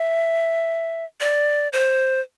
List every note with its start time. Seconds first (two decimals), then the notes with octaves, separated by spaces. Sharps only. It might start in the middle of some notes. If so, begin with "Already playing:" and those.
Already playing: E5
1.20 D5
1.73 C5